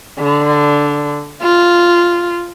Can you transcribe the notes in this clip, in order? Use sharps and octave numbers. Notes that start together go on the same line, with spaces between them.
D3
F4